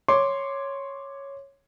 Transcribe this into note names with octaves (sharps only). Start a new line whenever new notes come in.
C#5 C6 D6